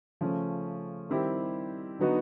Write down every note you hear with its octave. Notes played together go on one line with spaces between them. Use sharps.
C#3 F3 A3 C#4
D#3 G3 C4 E4 G4
D3 F#3 B3 D#4 F#4